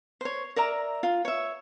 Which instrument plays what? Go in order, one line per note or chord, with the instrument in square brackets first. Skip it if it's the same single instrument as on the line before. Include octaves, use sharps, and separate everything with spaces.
[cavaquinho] C5 C#5
A#4 D5 E5 A#5
F4
C#5 E5